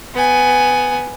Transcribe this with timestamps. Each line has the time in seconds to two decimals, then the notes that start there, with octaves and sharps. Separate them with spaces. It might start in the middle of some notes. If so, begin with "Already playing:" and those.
0.14 B3 G#5